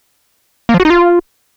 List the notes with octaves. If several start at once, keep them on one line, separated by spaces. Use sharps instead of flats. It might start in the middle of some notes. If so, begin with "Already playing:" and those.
A#3
F3
F#4
D#4
F4